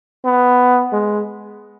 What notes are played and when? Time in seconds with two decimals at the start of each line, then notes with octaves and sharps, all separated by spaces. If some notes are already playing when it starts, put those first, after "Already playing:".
0.25 B3
0.93 G#3